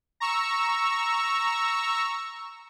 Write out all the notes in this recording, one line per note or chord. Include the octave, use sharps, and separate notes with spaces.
A#5 C#6 E6